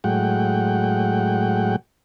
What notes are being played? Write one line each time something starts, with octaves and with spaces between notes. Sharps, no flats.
A2 F#3 G#3 F#5 G5